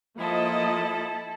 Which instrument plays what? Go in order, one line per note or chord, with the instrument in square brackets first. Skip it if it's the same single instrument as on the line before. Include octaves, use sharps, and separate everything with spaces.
[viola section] F3 A#3 D#5 [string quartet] E4 A4